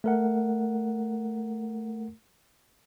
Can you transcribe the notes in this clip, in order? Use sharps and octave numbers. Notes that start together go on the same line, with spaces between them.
A3 A#4 F#5